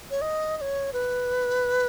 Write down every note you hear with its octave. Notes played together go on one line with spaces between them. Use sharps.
C#5
D#5
D#5
C#5
B4